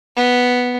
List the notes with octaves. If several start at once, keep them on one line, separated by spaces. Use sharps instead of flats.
B3